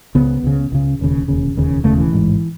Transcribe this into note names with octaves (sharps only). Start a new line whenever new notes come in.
C#2 C#3 B3
C#2 C#3
C#2 C#3
E1 D#2 C#3
E1 D#2 C#3
E1 D#2 C#3
E1 D#2 C#3 A3
E3
A1 G#2